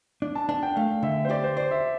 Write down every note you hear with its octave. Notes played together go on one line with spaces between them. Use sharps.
D4
A5
D4 A5
G5
A3 F5
D3 E5
C5
G4 D5
C5
C5 D5
E5